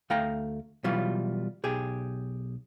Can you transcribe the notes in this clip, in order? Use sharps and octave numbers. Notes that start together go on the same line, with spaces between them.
D2 A3 F5 G5 A#5
B2 E3 F#3 G3 F4
B1 G4 G#4